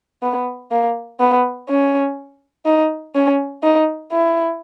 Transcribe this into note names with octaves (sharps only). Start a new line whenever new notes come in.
B3
A#3
B3
C#4
D#4
C#4
D#4
E4